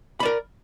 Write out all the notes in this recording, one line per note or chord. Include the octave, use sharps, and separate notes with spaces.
A#4 D5 B5